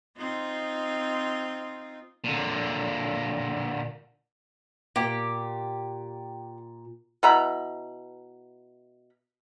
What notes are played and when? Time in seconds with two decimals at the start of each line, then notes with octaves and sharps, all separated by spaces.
0.18 C4 D#4 F4
2.24 A#2 D3
4.96 A#2 G4
7.23 B2 E4 A#5 B5